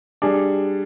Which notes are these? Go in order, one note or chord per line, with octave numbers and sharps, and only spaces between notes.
G3 D4 G#4